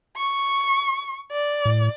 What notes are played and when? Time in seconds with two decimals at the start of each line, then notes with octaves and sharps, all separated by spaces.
0.16 C#6
1.32 D5
1.65 A2